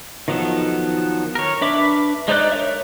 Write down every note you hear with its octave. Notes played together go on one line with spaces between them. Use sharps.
D#3 F3 F#3 B3 A4
A#4 C#5
D4 B4 E5 B5 D6
G#3 D#4 C5 D5 F#6
A#4 C#5 E5